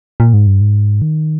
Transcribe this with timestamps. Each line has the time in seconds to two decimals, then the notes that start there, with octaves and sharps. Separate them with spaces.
0.20 A#2
0.34 G#2
0.47 G2
0.61 G#2
1.02 D#3